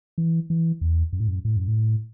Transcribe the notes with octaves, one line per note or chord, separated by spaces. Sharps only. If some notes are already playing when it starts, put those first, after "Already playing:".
E3
E3
E2
F#2
A2
F#2
A2
F#2
A2